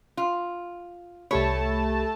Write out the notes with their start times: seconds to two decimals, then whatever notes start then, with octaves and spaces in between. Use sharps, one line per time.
0.17 F4
1.31 C2 A3 G4 C#5 A5 B5